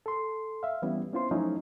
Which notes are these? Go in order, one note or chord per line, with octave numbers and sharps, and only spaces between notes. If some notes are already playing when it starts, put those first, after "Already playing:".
A4 C6
E5 F5
E3 G3 B3 C#4 E4
B3 C#4 E4 F4 C5 C6
F3 F#3 A3 C#4 D#4 E4